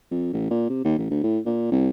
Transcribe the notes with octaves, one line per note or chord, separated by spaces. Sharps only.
F2
A1
A#2
C3
D#2
A1
D2
A2
A#2
C2